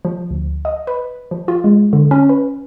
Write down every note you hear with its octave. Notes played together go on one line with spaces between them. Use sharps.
F3
D2
D#5
B4
F3
F4
G#3
D3
C#4
B4